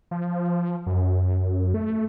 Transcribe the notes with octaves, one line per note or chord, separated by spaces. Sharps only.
F3
F#2
A3